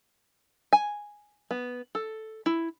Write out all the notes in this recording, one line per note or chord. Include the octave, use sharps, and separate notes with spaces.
G#5
B3
A4
E4